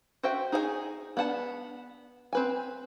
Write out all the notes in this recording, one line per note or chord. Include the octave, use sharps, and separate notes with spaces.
F#4 A4 C5 E5 G5
D#4 G#4 C5 F5 G#5
B3 D4 F#5 A5
C4 B4 G#5